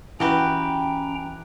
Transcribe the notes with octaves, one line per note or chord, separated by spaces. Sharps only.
E3 C#4 F#4 G4 B4 G5 A#5